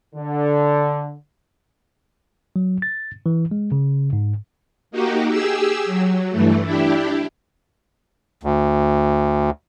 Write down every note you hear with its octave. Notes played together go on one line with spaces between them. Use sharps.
D3
F#3
A6
E3
G#3
C#3
G#2
A#3 D#4 F#4 G4
G4 G#4 E6
F#3
G2 E3 A3
D4 E4 G4
D2